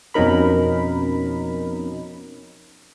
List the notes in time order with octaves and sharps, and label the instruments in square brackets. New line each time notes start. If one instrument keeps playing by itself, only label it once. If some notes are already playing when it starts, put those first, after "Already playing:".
[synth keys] F2 B2 C#4 D#4 A#4 B5